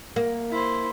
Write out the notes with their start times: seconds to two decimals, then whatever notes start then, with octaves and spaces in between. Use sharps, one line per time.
0.16 A#3
0.50 E4 C5